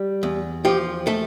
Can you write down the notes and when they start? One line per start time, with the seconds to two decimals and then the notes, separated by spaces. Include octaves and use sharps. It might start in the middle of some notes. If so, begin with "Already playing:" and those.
Already playing: G3
0.23 E2
0.65 F3 G4
1.07 A3 A4